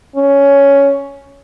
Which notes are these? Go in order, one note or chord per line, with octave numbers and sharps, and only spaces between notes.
C#4